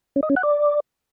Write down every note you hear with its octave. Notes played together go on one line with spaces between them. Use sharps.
C#4
D#5
C#4
F#5
D5